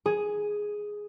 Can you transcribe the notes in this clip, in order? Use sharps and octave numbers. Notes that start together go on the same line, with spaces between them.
G#4